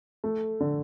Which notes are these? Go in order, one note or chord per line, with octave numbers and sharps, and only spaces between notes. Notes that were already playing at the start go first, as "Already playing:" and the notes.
A3
D3